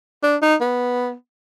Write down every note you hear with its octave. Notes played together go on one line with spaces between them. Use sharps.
D4
D#4
B3